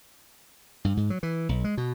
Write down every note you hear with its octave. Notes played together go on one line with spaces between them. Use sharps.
G2
G#2
F#3
E3
B1
G#3
B2